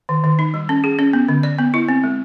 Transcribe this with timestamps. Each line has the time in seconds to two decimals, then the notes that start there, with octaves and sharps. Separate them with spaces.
0.09 D#3
0.24 D#3
0.39 D#4
0.54 G3
0.69 C#4
0.84 G#4
0.99 C#4
1.13 B3
1.28 D3
1.43 D5
1.58 B3
1.74 E4
1.89 C4
2.04 G#3